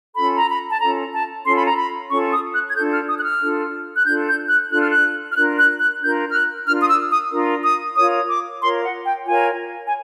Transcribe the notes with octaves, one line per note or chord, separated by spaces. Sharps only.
C#4 F4 A4 B5
A#5
B5
A5
C#4 F4 A4 A#5
A5
C#4 F4 A4 C6
B5
A#5
B5
C#4 F4 A4 C#6
D#6
F#6
G#6
D4 F4 A4 G6
F6
D#6
F#6
F6
D4 F4 A4
F#6
D4 F4 A4 G6
G6
F#6
D4 F4 A4 F#6
F6
F#6
F6
D4 F4 A#4 F#6
F#6
F#6
D4 F4 A#4 G6
F6
F#6
D4 F4 A#4 F6
D#6
E6
D#6
D4 F4 A#4
D#6
F4 A#4 C#5 D#6
D6
F4 A#4 C#5 C6
F#5
G5
F4 A#4 C#5 G#5
G#5